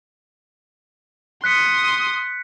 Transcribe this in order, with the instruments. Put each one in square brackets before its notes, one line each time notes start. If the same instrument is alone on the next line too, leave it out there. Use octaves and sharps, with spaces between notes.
[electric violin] C6 D#6 [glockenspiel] F#6 B6 C#7